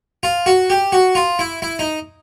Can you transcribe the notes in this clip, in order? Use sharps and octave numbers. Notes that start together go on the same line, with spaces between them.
F4
F#4
G4
F#4
F4
E4
E4
D#4